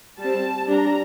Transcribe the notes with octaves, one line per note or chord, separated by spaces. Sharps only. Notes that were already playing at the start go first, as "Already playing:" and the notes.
G3 C4 A5
G3 D4 A#5